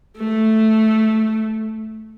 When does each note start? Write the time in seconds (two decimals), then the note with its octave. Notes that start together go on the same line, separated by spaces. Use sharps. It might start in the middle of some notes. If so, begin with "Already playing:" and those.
0.18 A3